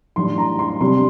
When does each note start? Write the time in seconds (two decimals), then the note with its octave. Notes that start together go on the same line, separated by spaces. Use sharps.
0.16 A2 E3 G3 D4 C6
0.38 A#5
0.59 C6
0.81 C3 G3 D4 C6